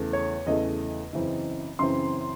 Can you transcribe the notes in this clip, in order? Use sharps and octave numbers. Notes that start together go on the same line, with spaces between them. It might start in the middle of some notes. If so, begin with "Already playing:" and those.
Already playing: E2 C#3 E3 A3
C#5
E2 C#3 E3 A3 D#5
F#2 C#3 E3 C4
F#2 C#3 E3 C4 C6